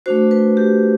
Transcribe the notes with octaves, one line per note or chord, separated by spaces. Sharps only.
A3 D4 F#4 C5
B4
G4